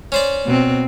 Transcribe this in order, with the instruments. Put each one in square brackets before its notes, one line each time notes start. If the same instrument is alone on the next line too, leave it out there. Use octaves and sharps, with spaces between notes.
[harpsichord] C#4 C5 D5
[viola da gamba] B2 C4